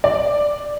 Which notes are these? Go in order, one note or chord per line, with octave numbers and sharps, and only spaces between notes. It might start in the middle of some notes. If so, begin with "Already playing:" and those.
D5